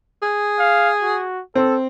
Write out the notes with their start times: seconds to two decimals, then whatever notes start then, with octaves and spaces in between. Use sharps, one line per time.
0.22 G#4
0.59 F5
1.02 F#4
1.55 C4 A4